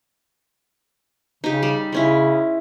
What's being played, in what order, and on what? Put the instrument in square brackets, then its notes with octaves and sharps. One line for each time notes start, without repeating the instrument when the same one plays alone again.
[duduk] C#3 [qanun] D#4 G4
[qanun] G3
[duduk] C#3 [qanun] G#3 C#4 E4